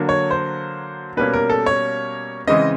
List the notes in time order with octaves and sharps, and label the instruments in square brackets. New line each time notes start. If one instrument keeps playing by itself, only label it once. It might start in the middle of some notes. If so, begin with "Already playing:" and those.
Already playing: [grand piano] D3 F#3 A#3
C#5
C5
B2 G3 A#3 C#4 B4
A#4
A4
C#5
C#3 E3 G#3 C4 D#5